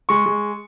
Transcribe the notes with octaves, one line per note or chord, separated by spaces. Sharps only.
G#3 C#6
G#3